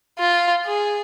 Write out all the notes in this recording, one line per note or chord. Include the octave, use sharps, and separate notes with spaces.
F4
G#4